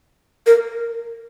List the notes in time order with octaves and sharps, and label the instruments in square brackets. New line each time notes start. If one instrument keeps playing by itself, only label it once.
[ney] A#4